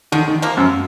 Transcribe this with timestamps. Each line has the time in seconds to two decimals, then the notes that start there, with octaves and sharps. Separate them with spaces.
0.12 D3 D#3
0.28 D#3
0.42 F3 A#3
0.57 F#2